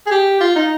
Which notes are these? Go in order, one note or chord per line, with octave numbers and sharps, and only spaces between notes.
G#4
G4
F4
D#4